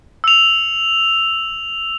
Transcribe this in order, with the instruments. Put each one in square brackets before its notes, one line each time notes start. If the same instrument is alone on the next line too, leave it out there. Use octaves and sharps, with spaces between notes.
[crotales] E6 F7